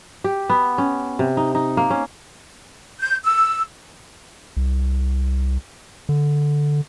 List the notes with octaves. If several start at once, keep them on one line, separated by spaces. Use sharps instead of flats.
G4
B3
C#4
C3
D#4
D#4
A#3
C#4
G6
E6
C2
D3